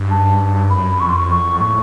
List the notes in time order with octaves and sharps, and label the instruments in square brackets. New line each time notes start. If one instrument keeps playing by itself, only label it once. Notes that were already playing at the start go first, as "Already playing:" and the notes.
Already playing: [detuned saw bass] G2
[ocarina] A5
[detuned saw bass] F#2 [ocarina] B5
[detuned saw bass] F2 [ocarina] C#6
[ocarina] C6
C#6
C#6
[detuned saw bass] A2 [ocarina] C#6